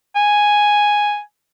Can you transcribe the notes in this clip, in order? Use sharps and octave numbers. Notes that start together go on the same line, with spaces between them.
G#5